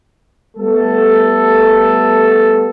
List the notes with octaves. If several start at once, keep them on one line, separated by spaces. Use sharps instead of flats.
G3 A3 B3 A4